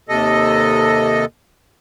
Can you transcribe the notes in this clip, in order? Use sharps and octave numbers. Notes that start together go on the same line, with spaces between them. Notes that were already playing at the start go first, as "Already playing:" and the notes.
D#2 C3 A4 D#5